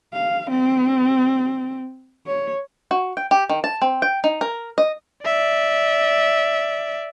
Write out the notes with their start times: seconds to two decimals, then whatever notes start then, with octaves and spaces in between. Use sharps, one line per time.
0.13 F5
0.50 C4
2.26 C#5
2.91 F#4
3.17 G5
3.31 G4
3.49 D#3
3.64 A5
3.82 C4
4.02 G5
4.24 D#4
4.41 A#4
4.78 D#5
5.24 D5 E5